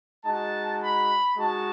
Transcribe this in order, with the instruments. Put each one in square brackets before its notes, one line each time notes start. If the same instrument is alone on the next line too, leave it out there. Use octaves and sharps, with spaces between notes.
[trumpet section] G#3 D#4 F#4 A5
B5
G#3 D#4 F#4 A5